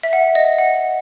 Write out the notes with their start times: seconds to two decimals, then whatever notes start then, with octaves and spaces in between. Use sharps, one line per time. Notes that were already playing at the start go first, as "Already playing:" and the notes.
0.03 E5
0.13 F#5
0.35 D#5
0.58 F#5